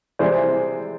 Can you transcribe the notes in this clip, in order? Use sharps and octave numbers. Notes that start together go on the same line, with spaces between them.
C3 E3 G#3 C5 D5